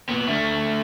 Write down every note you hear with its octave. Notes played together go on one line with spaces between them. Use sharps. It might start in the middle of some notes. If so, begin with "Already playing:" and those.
A#2 B3
D3 A3